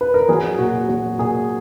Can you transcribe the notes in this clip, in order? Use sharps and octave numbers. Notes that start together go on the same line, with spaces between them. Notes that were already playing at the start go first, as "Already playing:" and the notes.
B4
A#4
F#3 G#4
A#2 F#4
F#3 F#4
A#2 G#4